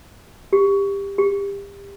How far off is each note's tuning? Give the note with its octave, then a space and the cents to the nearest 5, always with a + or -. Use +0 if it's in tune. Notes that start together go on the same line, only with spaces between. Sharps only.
G4 +20
G4 +30